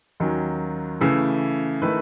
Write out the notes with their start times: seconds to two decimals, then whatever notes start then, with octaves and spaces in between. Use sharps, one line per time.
0.20 D#2 D#3 F#3 C#4
1.01 C#3 E3 A3 E4
1.82 D#3 A3 E4 B4